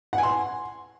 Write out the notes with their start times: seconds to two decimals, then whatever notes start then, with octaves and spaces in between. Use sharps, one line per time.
0.13 F#5
0.18 G#5
0.23 C6